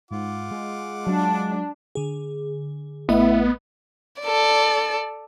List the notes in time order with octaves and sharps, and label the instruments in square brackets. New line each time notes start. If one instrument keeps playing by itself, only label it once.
[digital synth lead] G#2 [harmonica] F4 F#5 D6
[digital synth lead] G#3
[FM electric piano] F#3 [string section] D4
[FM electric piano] D3 G#4
[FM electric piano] A1 A3 D#5 [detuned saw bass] B3 [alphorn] E4
[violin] A4 D5